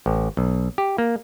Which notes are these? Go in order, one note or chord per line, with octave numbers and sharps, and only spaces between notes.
A1
B1
G4
A#3